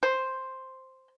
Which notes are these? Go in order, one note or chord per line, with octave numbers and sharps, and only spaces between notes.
C5